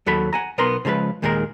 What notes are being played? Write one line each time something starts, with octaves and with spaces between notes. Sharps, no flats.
D#2 F#3 A4 B5
F#5 G#5 A#5
B1 B3 A#4 A#5 C6
C#3 F3 G#3 A#4 B4
D#2 A#2 D#3 G#3 F4 A#4